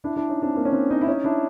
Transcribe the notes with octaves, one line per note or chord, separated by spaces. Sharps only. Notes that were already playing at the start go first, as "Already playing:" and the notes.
D4 E4
D4 E4
C#4 D#4
C4 D4
A#3 C4
C#4
C4 D4
C#4 D#4
E4
C#4 D#4
D4 E4